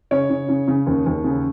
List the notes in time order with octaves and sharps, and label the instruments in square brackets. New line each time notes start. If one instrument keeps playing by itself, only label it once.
[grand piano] C#3 C#5
C#3
C#3
C#3
D#2
D#2
C#3